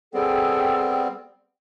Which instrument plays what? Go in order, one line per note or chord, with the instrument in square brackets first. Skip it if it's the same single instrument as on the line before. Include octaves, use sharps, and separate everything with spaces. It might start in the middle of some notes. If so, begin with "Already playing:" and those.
[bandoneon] G3 B3 C4 [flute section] G#4 A4 G5